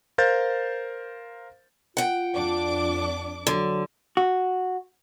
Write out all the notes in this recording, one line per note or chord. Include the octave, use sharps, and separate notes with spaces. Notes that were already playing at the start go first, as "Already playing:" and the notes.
A#4 C5 F5 G6 A6
F4 F#5 G5
F2 D4 D6
D3 F#3
F#4